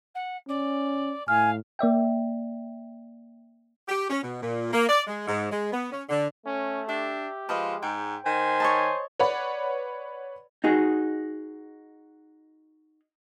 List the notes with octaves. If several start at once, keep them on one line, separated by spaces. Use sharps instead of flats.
F#5
C#4 D5
A2 F5 G#5 F6
A#3 D5 E5 G5
G4
C#4
B2
A#2
A#3
D5
G#3
G#2
G#3
B3
C#4
D3
A3 C#4
D4 G4 E5
F3 G#3 B4 D#5 F5
G#2 G5
D#3 C5 G#5
C#5 D#5 A5
B4 C#5 D5 F#5 B5
D#4 F#4 G#4